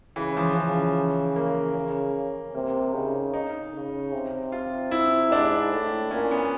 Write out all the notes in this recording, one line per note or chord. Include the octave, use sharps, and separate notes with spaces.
C#3 E3
F3
C#3 E3
A#3
C#3
C3 A#3
C#3 D#4
D#4
C#3
C3
F4
E4
G#2 D4
A2
A#2 C#4
B3